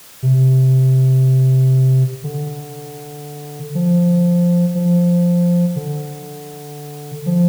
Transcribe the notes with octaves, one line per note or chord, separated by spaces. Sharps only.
C3
D3
F3
F3
D3
F3